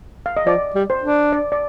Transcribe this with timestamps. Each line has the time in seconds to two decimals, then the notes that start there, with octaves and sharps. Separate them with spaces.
0.26 F5
0.37 D#5
0.46 F3 D5
0.75 G3
0.90 C5
1.03 D4
1.33 D5
1.52 D5